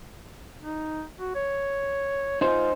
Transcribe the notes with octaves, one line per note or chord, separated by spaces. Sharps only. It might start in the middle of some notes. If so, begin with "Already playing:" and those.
D#4
F#4
C#5
D#4 F4 C5